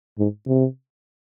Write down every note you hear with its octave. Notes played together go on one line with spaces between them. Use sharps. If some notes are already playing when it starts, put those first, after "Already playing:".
G#2
C3